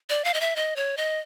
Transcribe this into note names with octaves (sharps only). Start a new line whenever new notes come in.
D5
F5
D#5
E5
D#5
C#5
D#5